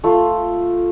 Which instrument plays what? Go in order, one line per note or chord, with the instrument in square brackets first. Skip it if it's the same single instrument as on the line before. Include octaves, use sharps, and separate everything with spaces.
[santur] A3 F4 C6